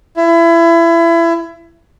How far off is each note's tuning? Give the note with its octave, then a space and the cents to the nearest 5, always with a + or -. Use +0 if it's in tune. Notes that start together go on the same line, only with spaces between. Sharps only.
E4 +30